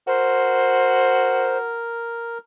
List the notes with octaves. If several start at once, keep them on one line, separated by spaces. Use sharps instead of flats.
F#4 A#4 C5